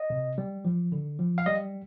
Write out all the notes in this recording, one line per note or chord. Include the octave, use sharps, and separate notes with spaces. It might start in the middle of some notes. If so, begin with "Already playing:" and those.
Already playing: D#5
C3
G3
F3
D3
F3
F5
G3 D#5